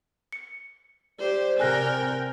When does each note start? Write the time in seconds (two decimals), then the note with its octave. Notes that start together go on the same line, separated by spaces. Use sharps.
0.32 C#7
1.20 G4 C5 D5
1.60 C3 A#4 G5 G#5 F#6 A#6